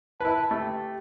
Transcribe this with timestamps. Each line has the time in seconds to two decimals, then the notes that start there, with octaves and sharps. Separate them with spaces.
0.20 E4 B4 A5
0.51 A3 G4